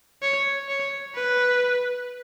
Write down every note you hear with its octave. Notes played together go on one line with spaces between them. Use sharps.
C#5
C#5
B4